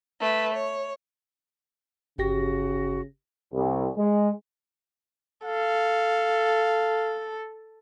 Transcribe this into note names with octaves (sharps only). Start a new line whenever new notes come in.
A3 B4
C#5
G1 C#3 F#4 G4 A#6
C2
G#3
A4 F5